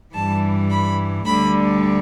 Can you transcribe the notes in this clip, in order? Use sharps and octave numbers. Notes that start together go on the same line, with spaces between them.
G2 E3 G3 A5
B5
D2 D3 G3 B5